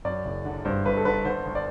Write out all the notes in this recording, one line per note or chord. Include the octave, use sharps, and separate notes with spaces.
F#2 D5
F#1
D3
G2 C5
G1 B4
A4
D3 B4
D3 C5
D2
D5